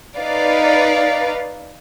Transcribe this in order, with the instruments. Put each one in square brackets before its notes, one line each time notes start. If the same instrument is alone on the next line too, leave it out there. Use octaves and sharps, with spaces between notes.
[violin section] D#4 B4 D5 F5